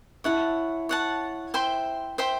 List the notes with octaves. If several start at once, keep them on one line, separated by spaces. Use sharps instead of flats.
E4 C#5 F#5 A5
C#5 F#5 A5
C5 E5 G5 C6
C5 E5 G5 C6